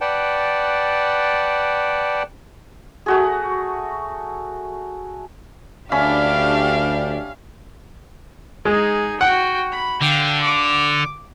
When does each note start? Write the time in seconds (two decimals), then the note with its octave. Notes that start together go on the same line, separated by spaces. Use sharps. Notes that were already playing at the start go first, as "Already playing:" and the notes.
0.01 B4 D5 F#5 G5 A5
3.06 A3 F#4 G#4
5.92 D2 C#4 D4 G4 E5 F5 B5
8.65 G#3 D#4 G#4
9.21 F#4 F#5 G5
9.72 B5
10.01 D3 F5 G5
10.43 D6